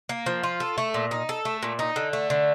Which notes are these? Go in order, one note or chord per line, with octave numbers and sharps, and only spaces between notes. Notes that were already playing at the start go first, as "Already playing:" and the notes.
A#3
F3
F4
A4
A3
A#2
D#4
A4
A3
A#2
D#4
D3
A3
D3